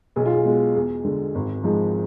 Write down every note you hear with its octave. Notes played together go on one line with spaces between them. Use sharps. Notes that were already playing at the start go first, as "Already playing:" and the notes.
B1 G#4
F4
G#4
B2 G#3
E2 G#4
D3 G#3
G#1
G#2 F3 G#3